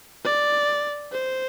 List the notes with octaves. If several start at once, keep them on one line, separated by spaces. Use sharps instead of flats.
D5
C5